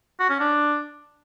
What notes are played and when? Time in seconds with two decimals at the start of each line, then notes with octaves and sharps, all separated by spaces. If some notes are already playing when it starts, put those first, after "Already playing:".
0.20 F#4
0.30 C#4
0.40 D4